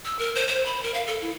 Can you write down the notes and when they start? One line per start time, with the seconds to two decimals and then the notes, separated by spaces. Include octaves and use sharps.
0.05 E6
0.19 A#4
0.35 C5
0.48 C5
0.66 B5
0.83 A#4
0.94 F5
1.07 A4
1.21 E4